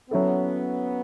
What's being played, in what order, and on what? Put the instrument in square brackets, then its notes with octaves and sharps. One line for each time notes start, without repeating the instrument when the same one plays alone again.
[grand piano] F#3 C#4 E4 A4 [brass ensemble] B3